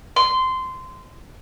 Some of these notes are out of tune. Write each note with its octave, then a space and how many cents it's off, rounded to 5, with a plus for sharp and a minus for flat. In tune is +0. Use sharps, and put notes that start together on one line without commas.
C6 -15